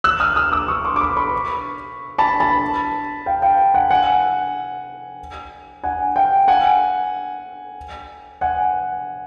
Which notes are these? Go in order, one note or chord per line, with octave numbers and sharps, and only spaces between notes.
E6 F#6
D#6 F6
D#6 F6
D6 E6
C#6 D#6
C6 D6
D6
B5 C#6
B5 C#6
A5 B5
A5 B5
F5 G5
F5 G5
F#5 G#5
F#5 G#5
F#5 G#5
F5 G5
F#5 G#5
F#5 G#5